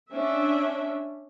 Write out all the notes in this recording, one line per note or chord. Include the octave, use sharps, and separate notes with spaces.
C#4 D4 E5